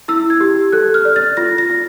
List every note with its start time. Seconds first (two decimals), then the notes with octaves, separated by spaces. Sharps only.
0.08 E4 E6
0.30 G#6
0.40 G4
0.73 A4 F#6
0.94 F6
1.05 D5
1.16 A6
1.37 F4 A#6
1.58 A#6
1.70 F4